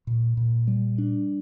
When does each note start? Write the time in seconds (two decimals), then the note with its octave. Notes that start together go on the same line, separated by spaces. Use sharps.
0.07 A#2
0.37 A#2
0.68 G3
0.98 D4